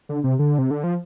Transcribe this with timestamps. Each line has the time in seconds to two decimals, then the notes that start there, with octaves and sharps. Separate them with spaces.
0.09 D3
0.24 C3
0.39 D3
0.58 C3
0.71 D3
0.84 F3